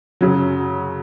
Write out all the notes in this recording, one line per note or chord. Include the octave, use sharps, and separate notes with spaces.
F#2 C#3 F#3